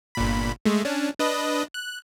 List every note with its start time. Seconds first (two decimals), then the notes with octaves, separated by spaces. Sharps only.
0.15 G1 A#2 B5
0.65 G#3 A3
0.85 C#4 D4
1.20 D4 B4 D#5
1.74 F#6